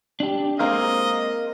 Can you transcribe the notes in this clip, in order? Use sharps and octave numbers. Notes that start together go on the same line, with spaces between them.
D4 G4
G#3 A#3 C4 A#4 C5 D#5 F5